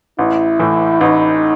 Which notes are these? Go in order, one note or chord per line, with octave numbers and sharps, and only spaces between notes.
A1 E4
A2 E3
A1 D#4